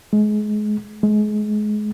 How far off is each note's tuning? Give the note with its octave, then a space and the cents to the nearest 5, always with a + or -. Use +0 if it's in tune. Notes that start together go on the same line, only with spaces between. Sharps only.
G#3 +25
G#3 +25